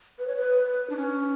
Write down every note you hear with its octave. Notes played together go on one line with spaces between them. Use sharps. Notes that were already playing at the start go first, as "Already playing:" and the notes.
B4
C#5
B4
D4
C#4